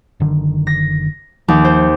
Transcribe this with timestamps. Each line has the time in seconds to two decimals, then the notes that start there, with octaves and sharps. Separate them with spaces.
0.20 F#1 D3 D#3
0.67 A#6
1.48 D#2 F3
1.64 C5